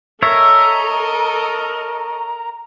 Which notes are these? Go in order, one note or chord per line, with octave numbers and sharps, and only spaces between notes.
A4 A#4 C#5 D#5 E5